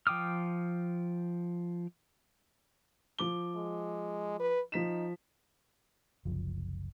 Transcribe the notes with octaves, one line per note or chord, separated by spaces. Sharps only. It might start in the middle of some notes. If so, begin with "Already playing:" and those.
F3 G5 D6 D#6 F6
F3 D6 G7
G#3
B4
F3 D#4 B6 E7
F#1 C2 F3